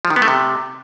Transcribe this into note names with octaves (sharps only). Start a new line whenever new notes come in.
F3
D#3
B3
A3
C3